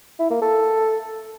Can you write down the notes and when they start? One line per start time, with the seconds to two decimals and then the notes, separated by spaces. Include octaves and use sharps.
0.19 E4
0.31 A#3
0.42 A4